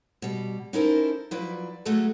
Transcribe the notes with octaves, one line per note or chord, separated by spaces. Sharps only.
B2 G3
C#4 D#4 E4 A4 A#4 C5
F3 F#3 E4 B4 D5
F#3 G#3 A3 D4 F#4 G#4